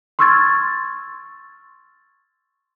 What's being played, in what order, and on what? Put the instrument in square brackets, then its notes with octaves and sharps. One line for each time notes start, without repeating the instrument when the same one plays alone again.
[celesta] C6 C#6 E6 F6 G#6 A6